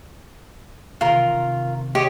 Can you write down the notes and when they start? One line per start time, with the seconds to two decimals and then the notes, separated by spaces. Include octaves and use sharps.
1.01 C3 D#3 F4 A#4
1.95 G4 C#5 D#5